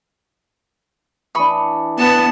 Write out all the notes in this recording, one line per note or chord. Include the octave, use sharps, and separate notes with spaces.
E3 D4 B5 C#6 D#6
B3 A5